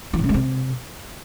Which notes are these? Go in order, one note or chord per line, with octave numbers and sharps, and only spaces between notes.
E3
B2
C#3
G#3
C3